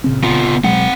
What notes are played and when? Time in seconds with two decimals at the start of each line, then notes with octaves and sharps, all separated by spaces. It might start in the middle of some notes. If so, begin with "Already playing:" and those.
0.04 A#2 C#3 C4
0.23 B3 F4
0.64 B2 F#3 G#3 C4 F#5